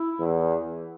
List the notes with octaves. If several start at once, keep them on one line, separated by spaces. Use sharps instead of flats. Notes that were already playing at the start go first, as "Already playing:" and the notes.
Already playing: E4
E2